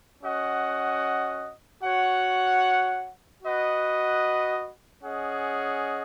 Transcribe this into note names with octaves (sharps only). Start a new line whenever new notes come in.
C#4 F#4 D#5 F#5
F#4 C#5 F#5
F#4 B4 D#5 F#5
C#4 G#4 D#5 F#5